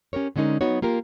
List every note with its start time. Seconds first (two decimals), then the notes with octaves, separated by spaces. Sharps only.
0.13 C#4 G4 A#4 C#5
0.36 D3 G#3 C#4 D#4 A#4
0.61 F#3 B3 D#4 F#4 C#5
0.82 A#3 F4 G4 A#4